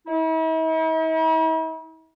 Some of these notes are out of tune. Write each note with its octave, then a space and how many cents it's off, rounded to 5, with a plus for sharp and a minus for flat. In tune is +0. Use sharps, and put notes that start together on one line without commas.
E4 -45